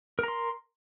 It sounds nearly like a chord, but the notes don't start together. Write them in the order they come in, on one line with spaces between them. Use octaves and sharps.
A#4 A#5 C6